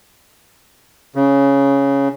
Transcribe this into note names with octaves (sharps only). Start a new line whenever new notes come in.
C#3